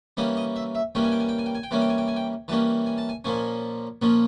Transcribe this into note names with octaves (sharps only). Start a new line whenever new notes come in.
E3 G3 A#3 C#4 D#5
D#5
E5
E5
E3 G3 A#3 C#4 G5
G#5
G5
G#5
G5
G#5
G5
G#5
G5
E3 G3 A#3 C#4 G#5
G5
G#5
G5
G#5
G5
E3 G3 A#3 C#4 A5
G#5
A5
G#5
A#2 F3 A#3 C#4 G#5
A#2 F3 A#3 C#4